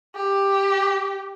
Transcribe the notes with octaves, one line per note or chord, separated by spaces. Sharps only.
G4